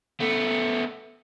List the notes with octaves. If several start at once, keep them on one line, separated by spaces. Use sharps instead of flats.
A3 B3